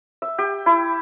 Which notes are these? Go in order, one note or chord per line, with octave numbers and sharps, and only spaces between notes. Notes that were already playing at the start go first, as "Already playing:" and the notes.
E5
G4
E4